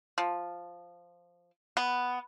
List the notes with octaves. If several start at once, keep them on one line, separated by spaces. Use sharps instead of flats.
F3
B3